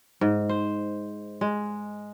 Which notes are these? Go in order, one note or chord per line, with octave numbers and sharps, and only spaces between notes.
G#2
C5
G#3